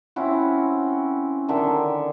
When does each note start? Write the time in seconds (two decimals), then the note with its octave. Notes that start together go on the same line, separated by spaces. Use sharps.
0.16 C4 C#4 E4 F#4
1.48 D3 D#3 E5